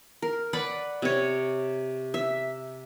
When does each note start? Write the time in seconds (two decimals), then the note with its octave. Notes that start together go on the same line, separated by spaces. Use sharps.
0.22 A#4
0.53 B4 D5 F#5 B5
1.02 C3 C#5
2.14 E5